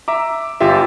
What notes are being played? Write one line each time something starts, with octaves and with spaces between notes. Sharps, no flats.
E5 A#5 D6
G1 F4 G4 E5